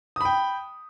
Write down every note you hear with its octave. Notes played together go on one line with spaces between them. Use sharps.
G5 B5 D#6